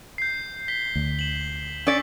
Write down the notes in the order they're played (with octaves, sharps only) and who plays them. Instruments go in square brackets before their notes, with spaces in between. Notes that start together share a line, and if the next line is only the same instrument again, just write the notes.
[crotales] G6 C7
B6 G7
[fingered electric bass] D2
[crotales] E7 F#7
[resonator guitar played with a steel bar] C#4 D5 [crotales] E6 B6